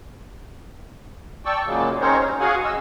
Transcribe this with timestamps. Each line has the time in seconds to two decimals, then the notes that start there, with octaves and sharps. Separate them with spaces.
1.45 D5 G5 A5 C#6 E6
1.66 A#2 C#3 F#3 G#3 A#3
2.01 C4 C#4 D#4 A#4 C5 C#5
2.24 G3
2.40 F#4 G#4 F5 F#5 G#5
2.65 F#2 D#5 E6